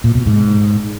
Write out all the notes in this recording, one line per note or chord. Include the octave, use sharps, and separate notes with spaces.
A#2
B2
G#2